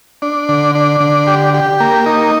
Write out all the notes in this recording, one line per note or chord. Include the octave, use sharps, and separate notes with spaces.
D4
D3
D4
D3
G4
G4
A#3
D#4